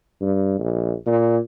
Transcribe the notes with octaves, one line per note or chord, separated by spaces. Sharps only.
G2
A#1
A#2